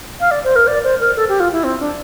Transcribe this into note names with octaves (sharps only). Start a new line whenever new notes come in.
F5
D5
C5
A#4
D5
C5
A#4
A4
G4
F4
E4
C4
D4